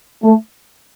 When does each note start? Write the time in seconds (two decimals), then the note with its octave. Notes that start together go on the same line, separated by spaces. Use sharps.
0.24 A3